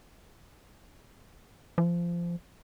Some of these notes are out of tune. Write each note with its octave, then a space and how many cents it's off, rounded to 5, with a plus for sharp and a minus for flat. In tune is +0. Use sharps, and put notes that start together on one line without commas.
F3 -20